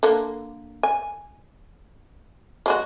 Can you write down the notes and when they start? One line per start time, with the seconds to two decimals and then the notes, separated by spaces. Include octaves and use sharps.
0.03 D3 A#3
0.83 G#5
2.66 F#3 G#3 F#4